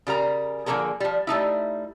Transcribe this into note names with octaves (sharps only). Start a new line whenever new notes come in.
C#3 G3 A#4 A#5
D3 F3 A#3 C#4 G#4 A#4
F3 G3
G3 A3 D#4 E4